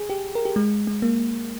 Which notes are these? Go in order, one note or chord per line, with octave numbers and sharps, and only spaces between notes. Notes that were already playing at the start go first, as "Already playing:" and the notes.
Already playing: G#4
G4
A#4
G4
G#3
G#3
A#3